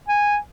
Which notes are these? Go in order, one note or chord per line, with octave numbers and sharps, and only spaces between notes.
G#5